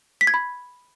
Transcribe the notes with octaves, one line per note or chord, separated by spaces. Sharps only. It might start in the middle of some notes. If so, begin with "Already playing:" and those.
B6
G#6
B5